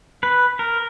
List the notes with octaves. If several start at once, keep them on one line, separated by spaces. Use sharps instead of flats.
B4
A#4